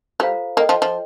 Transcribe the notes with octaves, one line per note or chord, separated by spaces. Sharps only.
G3 F4 A4 C5 F5 A#5
A#3 A4 D#5 G5
F3
F3